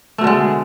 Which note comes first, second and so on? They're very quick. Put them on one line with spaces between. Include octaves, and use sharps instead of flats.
A3 B2 D3 G#3